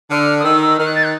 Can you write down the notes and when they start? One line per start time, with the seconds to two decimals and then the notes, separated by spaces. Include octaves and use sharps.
0.10 D3 F6
0.39 D#6
0.44 D#3 E6
0.61 E6
0.77 D#3 F6
0.86 F#6
0.95 A6
1.03 F#6